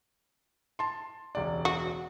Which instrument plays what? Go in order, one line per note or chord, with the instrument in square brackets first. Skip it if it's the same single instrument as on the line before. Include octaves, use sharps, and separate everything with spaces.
[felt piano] A5 C6
E1 C#2 D5
[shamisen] F#4